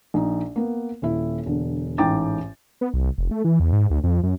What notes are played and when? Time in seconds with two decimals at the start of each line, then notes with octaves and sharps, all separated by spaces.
0.14 A#1 D#4
0.56 A#3 B3
1.02 D#1 E4
1.46 E1 D3
1.98 A1 G#2 G5 A#5 D6 A6
2.81 B3
2.93 C2
3.18 F1
3.31 A3
3.44 E3
3.60 E2
3.72 G#2
3.90 D2
4.04 F2
4.23 F#2